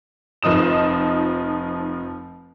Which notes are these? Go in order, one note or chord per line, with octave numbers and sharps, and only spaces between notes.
F1 F3 D#4 D#6 E7